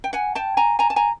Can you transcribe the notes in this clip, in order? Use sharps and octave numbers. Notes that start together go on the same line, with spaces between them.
G5
F#5 G#5
G5 A5
G#5 A#5
G#5 A#5
A5
G#5 A#5